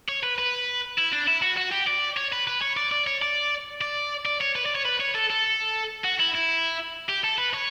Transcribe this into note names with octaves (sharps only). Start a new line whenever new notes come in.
C#5
B4
B4
E4
D4
E4
F#4
F#4
G4
D5
C#5
B4
B4
C#5
D5
D5
C#5
D5
D5
D5
C#5
B4
D5
C#5
B4
C#5
A4
A4
F#4
E4
E4
G4
A4
B4
C#5